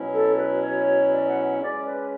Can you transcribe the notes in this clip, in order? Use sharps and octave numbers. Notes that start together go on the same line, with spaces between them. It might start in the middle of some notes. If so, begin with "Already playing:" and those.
Already playing: B2 F#3 C#4 E4
A4
B4
C#5
D5
F#5
C#3 G#3 C#4 D5
B4